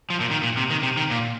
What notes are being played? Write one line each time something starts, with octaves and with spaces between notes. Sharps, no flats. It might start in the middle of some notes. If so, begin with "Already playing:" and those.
F3
A#2
D#3
A#2
C3
D#3
C3
D#3
A#2